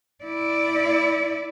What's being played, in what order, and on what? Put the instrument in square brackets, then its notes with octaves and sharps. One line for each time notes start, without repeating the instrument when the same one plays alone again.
[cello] E4 D5